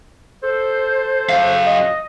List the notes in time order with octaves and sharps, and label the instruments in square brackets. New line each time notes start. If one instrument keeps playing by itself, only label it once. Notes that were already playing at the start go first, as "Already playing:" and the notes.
[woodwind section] A4 C5
[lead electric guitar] F#2 F5
[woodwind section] D#5